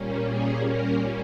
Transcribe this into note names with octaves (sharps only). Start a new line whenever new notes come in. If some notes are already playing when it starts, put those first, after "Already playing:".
Already playing: A#2 G3 A#3 C#4
G#4
A#4